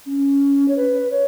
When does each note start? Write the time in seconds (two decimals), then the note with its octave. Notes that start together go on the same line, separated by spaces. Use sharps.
0.06 C#4
0.68 C#5
0.76 B4
1.10 C#5